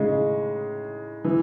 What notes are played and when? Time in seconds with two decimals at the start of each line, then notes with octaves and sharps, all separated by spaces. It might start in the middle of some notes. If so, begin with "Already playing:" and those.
Already playing: A2 C#3 G#3 D#4
1.24 E3